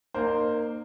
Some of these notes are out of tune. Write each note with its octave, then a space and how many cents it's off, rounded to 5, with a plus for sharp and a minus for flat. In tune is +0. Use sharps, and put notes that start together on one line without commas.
A#3 +0 D#4 -40 C5 +0